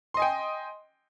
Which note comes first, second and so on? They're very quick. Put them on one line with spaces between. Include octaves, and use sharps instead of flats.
C6 D#5 G#5 G5